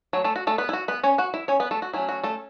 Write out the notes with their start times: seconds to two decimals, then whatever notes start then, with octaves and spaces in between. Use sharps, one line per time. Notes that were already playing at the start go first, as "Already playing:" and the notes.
0.13 F#3 A3 C#5
0.24 A3 A4
0.36 F#4
0.47 A3 A4
0.58 B3 B4
0.69 E4
0.73 F#4
0.88 B3 B4
1.03 C#4 C#5
1.18 F#4 F#5
1.34 E4 E5
1.48 C#4 C#5
1.60 B3 B4
1.71 A3 A4
1.82 F#4
1.93 F#3 A3 C#4 E4
2.09 F#4
2.24 A3 A4